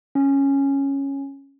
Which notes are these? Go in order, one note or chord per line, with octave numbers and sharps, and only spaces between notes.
C#4